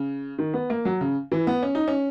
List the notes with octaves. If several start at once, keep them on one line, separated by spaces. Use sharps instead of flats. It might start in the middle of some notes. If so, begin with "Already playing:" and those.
Already playing: C#3
D#3
B3
A#3
F#3
C#3
E3
B3
C#4
D#4
C#4